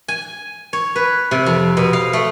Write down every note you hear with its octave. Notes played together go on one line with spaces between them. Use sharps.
G#5
C#5
B4
C3
F2
B2
F5
A3